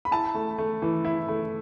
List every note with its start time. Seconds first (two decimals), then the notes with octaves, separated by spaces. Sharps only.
0.05 B5
0.11 E4 A5
0.35 A3
0.58 A3
0.82 E3
1.05 E4
1.28 A3